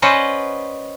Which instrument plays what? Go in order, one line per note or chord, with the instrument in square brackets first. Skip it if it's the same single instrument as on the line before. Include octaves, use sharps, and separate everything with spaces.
[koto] C#4 B4 C5 D5 D#5 F#5